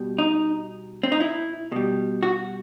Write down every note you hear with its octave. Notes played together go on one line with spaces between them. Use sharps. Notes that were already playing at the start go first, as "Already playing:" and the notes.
Already playing: B2 G3
D#4
C4
D#4
E4
B2 G3
F#4